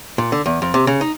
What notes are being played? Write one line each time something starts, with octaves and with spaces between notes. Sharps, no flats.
A#2
D3
E2
F2
C3
C#3
D#4